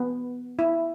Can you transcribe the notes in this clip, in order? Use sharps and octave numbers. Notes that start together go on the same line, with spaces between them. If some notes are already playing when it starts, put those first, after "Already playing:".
Already playing: B3
E4